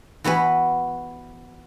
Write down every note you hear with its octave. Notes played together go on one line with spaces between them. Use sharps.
E3 B3 F#4 B4